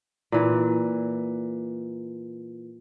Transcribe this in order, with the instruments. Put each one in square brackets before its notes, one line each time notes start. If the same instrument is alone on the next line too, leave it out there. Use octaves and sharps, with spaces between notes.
[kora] A#2 E3